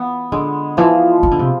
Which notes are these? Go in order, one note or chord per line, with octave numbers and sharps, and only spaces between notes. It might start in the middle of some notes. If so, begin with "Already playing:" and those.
Already playing: E3 B3
D3 G#3
E3 F3
E3
D3
C3